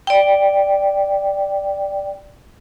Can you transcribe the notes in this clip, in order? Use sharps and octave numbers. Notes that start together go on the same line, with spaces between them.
D5 G5